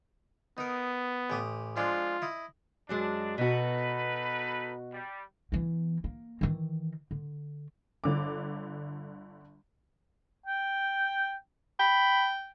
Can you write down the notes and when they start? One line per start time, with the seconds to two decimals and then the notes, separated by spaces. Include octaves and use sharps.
0.58 B3 D#4 A#4
1.30 A1 G4 D#6
1.77 F3 G#3 D4 F4
2.22 E4 D#5
2.89 F#2 F#3 G#3 D4
3.38 B2 D#4 F#4 A4 B4
4.93 G3
5.52 E3 B3
6.04 A#3
6.41 D#3 E3
7.11 D3
8.04 G1 D3 D6
10.46 G5
11.80 G5 B5